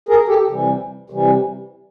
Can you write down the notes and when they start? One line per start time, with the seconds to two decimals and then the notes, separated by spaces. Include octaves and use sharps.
0.09 G#4 A#4
0.28 G4 A4
0.49 C3 E3 G3
1.10 C3 E3 G3